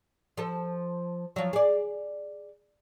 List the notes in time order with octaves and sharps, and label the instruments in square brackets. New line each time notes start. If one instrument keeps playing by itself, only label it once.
[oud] F3 A4
F3 F#3
G#4 D5